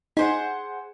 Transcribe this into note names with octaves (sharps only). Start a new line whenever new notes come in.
D#4 G#4 C5 F#5